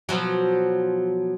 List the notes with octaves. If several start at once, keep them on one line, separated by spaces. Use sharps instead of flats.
B2 F3 F#3